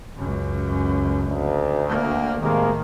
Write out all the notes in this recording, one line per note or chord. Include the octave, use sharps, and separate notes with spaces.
C#2 F#2
D2
A#3
A2 C3 D#3 G#3 A#3